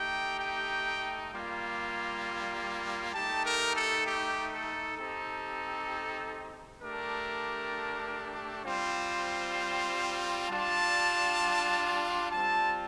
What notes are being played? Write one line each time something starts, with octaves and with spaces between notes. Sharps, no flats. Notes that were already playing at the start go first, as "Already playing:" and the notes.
Already playing: A3 D#4 G4 G5
G5
G3 A#3 F4
A3 D#4 G4 A5
A#4
A4
G4
A4
C4 D#4 G4 A4
A3 D4 G4 A#4
G3 C4 F4 C5
G3 D4 F4 A5
G3 C4 F4 A5